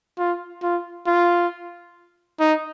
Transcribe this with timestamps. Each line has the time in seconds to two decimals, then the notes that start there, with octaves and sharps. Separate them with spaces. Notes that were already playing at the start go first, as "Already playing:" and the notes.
0.19 F4
0.63 F4
1.07 F4
2.40 D#4